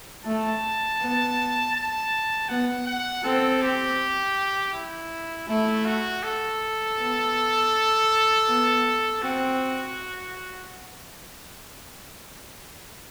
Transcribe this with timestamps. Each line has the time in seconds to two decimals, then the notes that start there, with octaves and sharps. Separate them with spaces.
0.25 A3 A5
0.99 B3
1.75 A5
2.49 B3 F#5
2.87 F#5
3.24 C4 A4
3.62 G4
4.73 E4
5.48 A3 E4
5.85 F#4
6.23 A4
6.97 B3
8.47 B3
9.21 C4 F#4